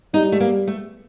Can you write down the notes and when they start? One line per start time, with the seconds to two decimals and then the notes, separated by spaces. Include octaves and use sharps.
0.14 G3 D#4
0.32 A3
0.40 A#3
0.67 A3